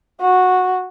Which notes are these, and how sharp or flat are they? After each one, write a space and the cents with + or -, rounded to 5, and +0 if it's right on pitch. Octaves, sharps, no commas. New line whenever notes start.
F#4 -10